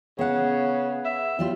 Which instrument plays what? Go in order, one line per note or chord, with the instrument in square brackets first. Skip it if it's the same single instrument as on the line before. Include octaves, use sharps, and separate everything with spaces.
[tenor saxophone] C#3 [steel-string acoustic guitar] B3 F#5
[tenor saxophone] E5
[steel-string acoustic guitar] F#3 G3 F4